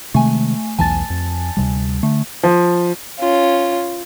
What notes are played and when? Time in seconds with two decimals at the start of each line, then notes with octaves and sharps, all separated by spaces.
0.14 C3 D#3 G#3 A3 G#5
0.79 B1 E2 E3 G#5 A5 A6
1.10 F2
1.57 D2 C3 G3
2.03 D3 A3
2.43 F3
3.19 C#4 F4